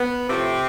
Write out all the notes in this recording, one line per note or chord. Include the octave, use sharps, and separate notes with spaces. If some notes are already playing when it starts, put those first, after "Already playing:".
Already playing: B3
A2 C3 F3 A3 C4